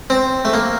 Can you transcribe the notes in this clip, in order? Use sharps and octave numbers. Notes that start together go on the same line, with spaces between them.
C4
A3
A#3